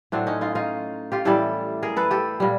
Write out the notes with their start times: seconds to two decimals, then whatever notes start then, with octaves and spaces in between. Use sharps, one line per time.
0.12 A2 F#3 C4 D4
0.27 C#4 D#4
0.41 D#4 F4
0.55 D#4 F4
1.12 F4 G4
1.25 A2 E3 G3 G4 A4
1.82 G#4 A#4
1.96 A4 B4
2.11 G4 A4
2.40 A#2 G3